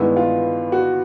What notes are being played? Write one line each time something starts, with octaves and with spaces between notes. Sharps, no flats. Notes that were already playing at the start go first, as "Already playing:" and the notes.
Already playing: G2 D#3 G#3 B3 E4
F4
F#4